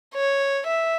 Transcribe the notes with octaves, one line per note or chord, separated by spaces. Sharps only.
C#5
E5